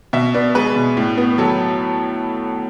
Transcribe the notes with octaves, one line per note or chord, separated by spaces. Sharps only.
B2 E5
B3 D5
G#3 B4
B2
A2
B3
F#3 A4